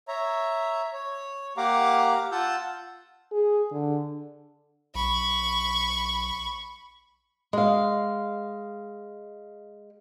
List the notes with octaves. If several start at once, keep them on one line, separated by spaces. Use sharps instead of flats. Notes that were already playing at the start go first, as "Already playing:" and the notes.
C#5 E5 A#5
C#5
A#3 G4 F5 F#5 A#5 D6
F4 F#5 A5 E6 G6
G#4
D3
B1 B5 C#6
G#3 F5